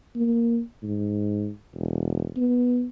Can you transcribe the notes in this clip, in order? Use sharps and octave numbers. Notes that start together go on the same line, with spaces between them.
A#3
G#2
E1
B3